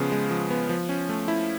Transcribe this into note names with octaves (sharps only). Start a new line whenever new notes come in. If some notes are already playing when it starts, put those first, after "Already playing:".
Already playing: C#3 F3 G#3 B3
G#3
F3
B3
F3
C#4
A3
E4